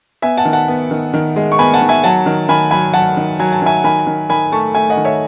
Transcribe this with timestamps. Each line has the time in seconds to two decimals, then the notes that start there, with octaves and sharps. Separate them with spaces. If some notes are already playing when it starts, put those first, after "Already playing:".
0.22 B3 E5 G#5
0.37 F#5 A5
0.45 D#3
0.53 F#5 A5
0.68 B3
0.91 D#3
1.14 D#3
1.36 G#3
1.52 C#6
1.58 B3 G#5 B5
1.74 F#5 A5
1.82 D#3
1.89 E5 G#5
2.04 F#3 F#5 A5
2.26 D#3
2.49 D#3 G#5 B5
2.71 F#3 G#5 B5
2.93 F#3 F#5 A5
3.17 D#3
3.39 F#3 G#5
3.53 A5
3.62 D#3 E5 G#5
3.84 D#3 G#5 B5
4.07 D#3
4.30 D#3 G#5 B5
4.52 A3 A5 C#6
4.75 A3 E5 G#5
4.90 D#5 F#5
4.97 D#3
5.05 C#5 E5